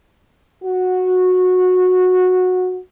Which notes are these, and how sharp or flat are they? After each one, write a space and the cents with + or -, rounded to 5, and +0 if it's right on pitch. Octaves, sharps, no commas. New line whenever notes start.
F#4 -15